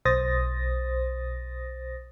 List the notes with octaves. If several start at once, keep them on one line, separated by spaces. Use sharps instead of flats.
B1 C5 D#6 A6 A#6